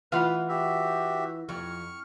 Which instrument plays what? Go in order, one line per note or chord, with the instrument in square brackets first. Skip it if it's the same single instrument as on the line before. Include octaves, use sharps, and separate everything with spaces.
[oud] E3 F4 [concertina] B4 [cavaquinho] F5 F#5 B5
[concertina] F#4 G4 E5
[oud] F2 [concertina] C#6 F6